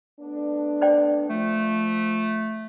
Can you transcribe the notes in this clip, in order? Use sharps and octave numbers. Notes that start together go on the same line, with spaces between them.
A3 B3 D4
C5 D5 G5
F3 A3